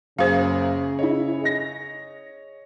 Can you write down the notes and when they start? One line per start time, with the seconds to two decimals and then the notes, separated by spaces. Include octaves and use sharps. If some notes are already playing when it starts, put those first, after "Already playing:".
0.19 F#2 C#3 A#3 G#4 C5 F5
0.99 E4 G#4 C#5 D#5
1.41 G#4 D#5 A#6